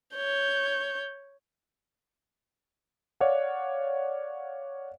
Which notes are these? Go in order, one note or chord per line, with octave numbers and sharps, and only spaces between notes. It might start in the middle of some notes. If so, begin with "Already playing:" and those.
C#5 G6
C#5 D5 F5 F#5